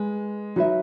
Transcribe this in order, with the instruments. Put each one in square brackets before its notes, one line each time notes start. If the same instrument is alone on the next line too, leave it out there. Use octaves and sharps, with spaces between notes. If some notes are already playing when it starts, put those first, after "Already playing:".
Already playing: [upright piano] G#3 [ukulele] G#4 B4
[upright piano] F#3 [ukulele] D#4 F#4 B4 E5